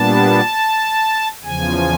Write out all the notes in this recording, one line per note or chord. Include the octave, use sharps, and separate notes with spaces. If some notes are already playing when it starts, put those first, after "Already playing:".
Already playing: A#2 G3 B3 D4 A5
E2 C#3 F3 G#5